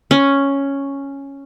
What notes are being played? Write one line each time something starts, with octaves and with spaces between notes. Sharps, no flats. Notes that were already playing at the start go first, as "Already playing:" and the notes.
C#4